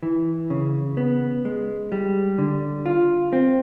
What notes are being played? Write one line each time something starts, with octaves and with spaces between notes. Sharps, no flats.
E3
C#3
B3
G#3
G3
D3
F4
C4